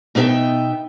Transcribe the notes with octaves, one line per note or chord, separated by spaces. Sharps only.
B2 B3 D#4 G4 E5 G5